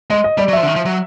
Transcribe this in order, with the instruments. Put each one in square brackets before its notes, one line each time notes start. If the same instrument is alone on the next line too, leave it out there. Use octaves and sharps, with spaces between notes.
[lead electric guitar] G#3 [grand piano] D#5
[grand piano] D#5
[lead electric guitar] G3 [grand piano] D5
[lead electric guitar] F#3
[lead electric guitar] F3 [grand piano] E5
[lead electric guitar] D3
D#3
F3
F#3